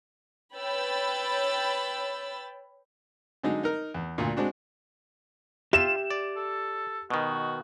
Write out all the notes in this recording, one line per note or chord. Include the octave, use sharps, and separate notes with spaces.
B4 C#5 G5 B5 E6 A6
D3 F#3 G#3 D#4
D#4 A#4
E2
D2 A#2
G#3 C4 D4 F#4
F4 G4 E5 E7
D5
A4
B2 D#3 F#4